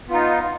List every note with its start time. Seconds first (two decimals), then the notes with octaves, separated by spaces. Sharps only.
0.07 B3
0.10 F4
0.13 D#4